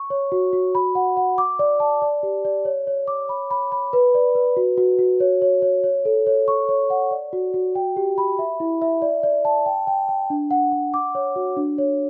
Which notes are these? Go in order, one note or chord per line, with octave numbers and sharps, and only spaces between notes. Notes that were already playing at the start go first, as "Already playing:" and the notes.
Already playing: C#6
C#5
F#4
F#4
B5
F#5
F#5
D6
D5
A5
D5
G4
D5
C#5
C#5
D6
B5
B5
B5
B4
D5
B4
F#4
F#4
F#4
C#5
C#5
C#5
C#5
A4
C#5
C#6
C#5
F#5
D5
F#4
F#4
G5
G4
B5
E5
E4
E5
D5
D5
A5
G5
G5
G5
D4
F#5
F#5
D6
C#5
F#4
D4
C#5